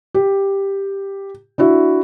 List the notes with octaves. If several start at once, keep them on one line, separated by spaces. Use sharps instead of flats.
G4
D4 E4 F#4 E5